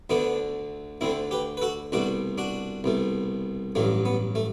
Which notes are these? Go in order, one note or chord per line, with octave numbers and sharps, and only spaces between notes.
D2 D3 A3 B3 D4
D2 D3 A3 C4 E4
G4 B4
B4
F#4 A4
C2 B2 A3 D4 F#4
D4 F#4
C2 B2 A3
A1 G2 F#3 A3
B3
A3